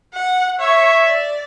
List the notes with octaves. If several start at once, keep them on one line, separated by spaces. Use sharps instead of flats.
F#5
C#5 E5
D5